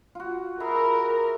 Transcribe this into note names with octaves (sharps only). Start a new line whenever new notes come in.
F4 F#4
G#4 A#4 E5 B5